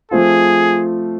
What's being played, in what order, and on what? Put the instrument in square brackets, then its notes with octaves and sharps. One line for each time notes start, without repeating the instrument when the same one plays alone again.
[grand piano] F3 A3 C4 F4 [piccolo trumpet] G#4